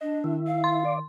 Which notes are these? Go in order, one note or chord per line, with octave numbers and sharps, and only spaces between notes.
D4 D#5
D#3 E4
F5
C6
D5